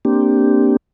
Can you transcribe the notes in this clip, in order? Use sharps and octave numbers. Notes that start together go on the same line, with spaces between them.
A#3 C4 D4 G4